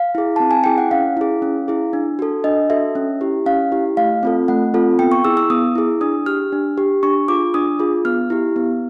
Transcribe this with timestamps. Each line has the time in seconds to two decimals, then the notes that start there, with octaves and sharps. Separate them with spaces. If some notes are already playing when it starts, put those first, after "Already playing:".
Already playing: F5
0.15 E4 G#4
0.36 C4 A5
0.51 G#5
0.64 E4 G#4 G5
0.78 F#5
0.91 C#4 F5
1.17 E4 G#4
1.42 C#4
1.68 E4 G#4
1.93 D4
2.19 F#4 A4
2.44 D4 D#5
2.70 F#4 A4 E5
2.95 C#4
3.21 E4 G4
3.46 C#4 F5
3.72 E4 G4
3.97 A3 F5
4.23 C4 F4 A4
4.48 A3 F#5
4.74 C4 F4 A4
4.99 B3 G5
5.12 C#6
5.25 E4 G#4 E6
5.37 E6
5.50 B3 D#6
5.75 E4 G#4
6.01 D4 D#6
6.26 G4 F6
6.52 D4
6.78 G4
7.03 D4 C#6
7.28 F4 G#4 D6
7.54 D4 D#6
7.79 F4 G#4
8.05 B3 F6
8.30 E4 G4
8.56 B3